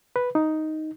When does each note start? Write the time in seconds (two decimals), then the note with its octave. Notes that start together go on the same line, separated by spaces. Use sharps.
0.16 B4
0.35 D#4